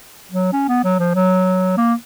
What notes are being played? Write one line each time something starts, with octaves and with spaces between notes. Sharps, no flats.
F#3
C#4
B3
F#3
F3
F#3
A#3